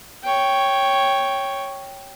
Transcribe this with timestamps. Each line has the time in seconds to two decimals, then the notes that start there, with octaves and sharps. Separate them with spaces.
0.24 C#5 G5